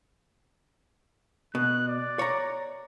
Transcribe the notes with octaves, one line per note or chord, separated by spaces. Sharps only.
B2 F#6
D5
C#5 A#5